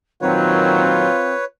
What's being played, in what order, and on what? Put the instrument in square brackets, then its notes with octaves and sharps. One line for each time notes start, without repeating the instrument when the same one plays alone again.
[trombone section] A#2 D#3 F#3 [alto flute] C4 [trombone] F4 [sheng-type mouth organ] B4 C#5